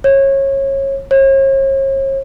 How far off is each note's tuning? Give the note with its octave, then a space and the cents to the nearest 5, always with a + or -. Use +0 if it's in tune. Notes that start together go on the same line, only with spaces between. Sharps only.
C#5 -25
C#5 -45